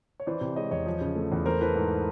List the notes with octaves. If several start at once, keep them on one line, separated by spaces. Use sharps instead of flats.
C#5
E3 C5 D5
C3
G#3 C#5 D#5
E2 C#5 D#5
F3
C#3
A3
E2
A3 A#4 C5
E3 A4 B4
G#2